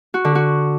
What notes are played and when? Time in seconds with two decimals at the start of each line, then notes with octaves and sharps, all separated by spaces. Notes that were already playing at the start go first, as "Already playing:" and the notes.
0.14 F#4
0.25 D3
0.35 F#4